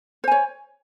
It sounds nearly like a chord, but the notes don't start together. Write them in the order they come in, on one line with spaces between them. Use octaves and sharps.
C5 G#5 C#5